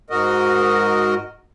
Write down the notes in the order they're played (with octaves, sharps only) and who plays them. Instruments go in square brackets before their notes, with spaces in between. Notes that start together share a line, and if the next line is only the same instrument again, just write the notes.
[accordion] G#2 F#4 A#4 D#5